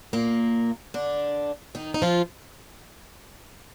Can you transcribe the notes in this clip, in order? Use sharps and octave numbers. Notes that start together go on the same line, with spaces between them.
A#2 A#3
D3 D4
D#3 D#4
D#4
F3 F4